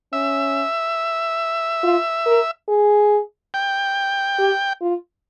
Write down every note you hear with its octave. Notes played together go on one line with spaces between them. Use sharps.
C#4 E5
F4
A#4
G#4
G5
G4
F4